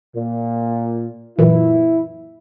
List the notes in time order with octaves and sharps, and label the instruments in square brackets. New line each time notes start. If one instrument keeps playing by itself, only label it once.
[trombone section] A#2
[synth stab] F#2 A#2 E3 [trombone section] E4